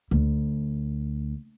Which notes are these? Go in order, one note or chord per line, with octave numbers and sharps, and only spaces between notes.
D2